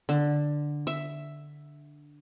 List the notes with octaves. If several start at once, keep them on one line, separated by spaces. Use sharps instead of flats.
D3
E5